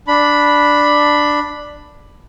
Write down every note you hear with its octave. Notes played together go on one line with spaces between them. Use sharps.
D4 B5